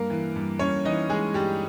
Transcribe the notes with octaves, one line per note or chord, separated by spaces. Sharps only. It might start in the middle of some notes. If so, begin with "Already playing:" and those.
Already playing: G2 A#3 A#4
E3
G2
G2 C#4 C#5
E3 D#4 D#5
E3 G#3 G#4
G2 G3 G4